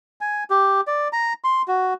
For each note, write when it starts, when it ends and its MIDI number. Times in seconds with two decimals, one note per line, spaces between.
0.21 0.44 80
0.50 0.81 67
0.87 1.08 74
1.13 1.33 82
1.44 1.62 84
1.68 1.94 66